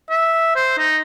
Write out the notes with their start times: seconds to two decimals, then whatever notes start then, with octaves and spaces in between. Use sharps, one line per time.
0.10 E5
0.56 C5
0.78 D#4